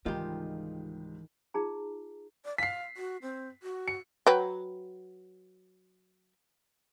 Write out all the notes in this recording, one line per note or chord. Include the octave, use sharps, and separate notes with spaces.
C#2 G#2 D#3 E3 G3 F4 G4
D#4 F4 G#4 A#5
D5
F5 B6 C7
F#4
C4
F#4
C#7
F#3 B4 G5